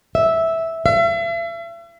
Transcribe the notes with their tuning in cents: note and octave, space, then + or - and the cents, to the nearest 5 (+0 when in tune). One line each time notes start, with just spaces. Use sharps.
E5 -10
E5 +40